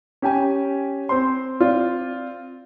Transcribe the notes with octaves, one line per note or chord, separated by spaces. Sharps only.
C#4 G4 G5 G#5
C4 C5 C6
C4 F4 D5